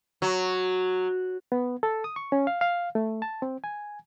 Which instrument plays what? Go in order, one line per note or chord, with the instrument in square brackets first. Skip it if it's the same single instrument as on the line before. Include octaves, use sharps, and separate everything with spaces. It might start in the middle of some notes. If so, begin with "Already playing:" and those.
[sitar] F#3
[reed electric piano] B3
A4
D#6
C#6
C#4
F5
F5
A3
A5
C4
G#5